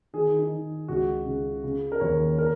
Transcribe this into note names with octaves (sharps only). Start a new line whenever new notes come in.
D#3 G#4
D#4
D#3
C#2 F#4
C#3
C#3
A#4
D#2 C#5
A#4